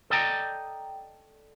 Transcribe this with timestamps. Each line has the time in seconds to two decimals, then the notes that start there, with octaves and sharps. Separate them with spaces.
0.10 A4 D5 D#5 G5 G#5 A#5